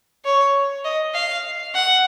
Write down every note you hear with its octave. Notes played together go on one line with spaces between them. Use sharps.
C#5
D#5
F5
F#5